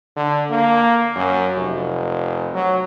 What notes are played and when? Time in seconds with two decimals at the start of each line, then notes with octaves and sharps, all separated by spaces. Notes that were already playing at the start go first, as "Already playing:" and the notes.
0.17 D3
0.51 A#3
1.16 F#2
1.56 F1
2.54 F#3